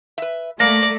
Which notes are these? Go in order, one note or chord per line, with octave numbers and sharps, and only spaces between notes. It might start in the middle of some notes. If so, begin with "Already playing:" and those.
B4 E5
A3 A#3 D5 A#6